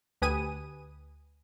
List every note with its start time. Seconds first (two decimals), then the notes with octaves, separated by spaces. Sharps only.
0.22 D2 G4 B4 G#5 D#6 D#7